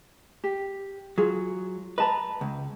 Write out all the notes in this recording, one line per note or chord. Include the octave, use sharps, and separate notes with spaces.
G4
F#3 F4 G#4
B4 D#5 A5 A#5
C#2